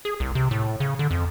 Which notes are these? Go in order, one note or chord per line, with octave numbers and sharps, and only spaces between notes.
G#4
C2
C3
A2
C#3
D3
F2